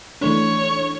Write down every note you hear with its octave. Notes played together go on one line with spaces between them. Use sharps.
E3 A3 D4 C#5